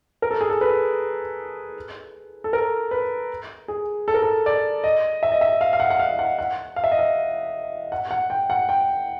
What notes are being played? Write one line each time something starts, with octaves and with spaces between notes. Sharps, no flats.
A#4
A4
G#4
A4
B4
A4
A#4
B4
G#4
A4
A#4
A4
D5
D#5
E5
D#5
E5
F5
F5
F#5
F#5
F5
F#5
F#5
F5
E5
D#5
E5
F#5
F#5
G5
F#5
G5